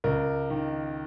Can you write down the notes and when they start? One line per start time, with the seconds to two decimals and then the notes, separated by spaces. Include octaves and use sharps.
0.04 C#2 A#4
0.50 D#3